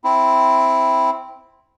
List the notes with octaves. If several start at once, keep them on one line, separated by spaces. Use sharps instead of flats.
C4 E4